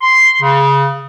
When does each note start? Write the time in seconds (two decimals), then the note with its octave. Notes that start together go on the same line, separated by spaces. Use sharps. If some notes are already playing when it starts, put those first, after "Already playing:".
0.01 C6
0.41 C#3